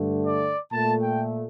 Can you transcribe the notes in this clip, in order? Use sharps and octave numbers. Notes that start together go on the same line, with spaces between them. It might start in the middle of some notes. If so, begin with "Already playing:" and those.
Already playing: G2 D3 A3
D5
A#2 A3 A5
G5